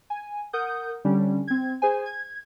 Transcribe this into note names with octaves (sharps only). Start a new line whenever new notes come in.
G#5
A#4 F#5 D#6 G6
D3 G3 C#4 D4
C4 G#6
G#4 C5 G#5
G#6